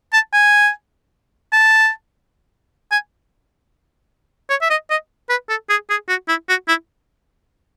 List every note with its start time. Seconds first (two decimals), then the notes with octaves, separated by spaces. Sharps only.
0.13 A5
0.33 G#5
1.53 A5
2.92 G#5
4.50 C#5
4.62 E5
4.70 D#5
4.90 D#5
5.30 B4
5.49 A4
5.70 G#4
5.90 G#4
6.09 F#4
6.28 E4
6.49 F#4
6.68 E4